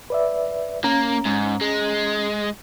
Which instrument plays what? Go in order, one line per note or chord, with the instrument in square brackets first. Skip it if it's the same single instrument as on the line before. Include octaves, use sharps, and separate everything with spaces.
[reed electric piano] B4 D5 E5
[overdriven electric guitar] A#3 [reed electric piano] C#4 A#5
[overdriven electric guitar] G#2
G#3